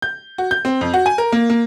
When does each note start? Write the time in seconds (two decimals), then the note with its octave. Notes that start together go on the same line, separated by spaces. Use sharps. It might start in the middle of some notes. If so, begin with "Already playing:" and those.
0.02 G6
0.38 F#4
0.51 G6
0.65 C4
0.81 F2
0.94 F#4
1.06 G#5
1.18 A#4
1.32 A#3
1.50 A#3